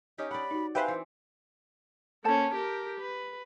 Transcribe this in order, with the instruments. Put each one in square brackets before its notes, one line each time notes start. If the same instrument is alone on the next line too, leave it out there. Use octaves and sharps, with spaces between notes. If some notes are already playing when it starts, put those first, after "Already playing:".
[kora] C#4 D#4 G4 [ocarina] D#5
[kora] D5 F#5 [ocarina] B5
[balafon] D#4 F#4
[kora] C4 [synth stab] G4 B4 C5 [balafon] E5 G#5 [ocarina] F5
[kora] E3 [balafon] C6
[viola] A#3 C#4 [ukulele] A4 C5 A5
[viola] G4 A#4
B4